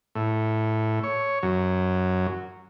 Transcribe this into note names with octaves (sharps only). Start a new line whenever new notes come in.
A2
C#5
F#2